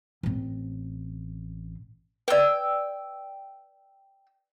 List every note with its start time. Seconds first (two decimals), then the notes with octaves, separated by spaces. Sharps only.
0.23 A1 C4
2.28 B4 D5 G5 E6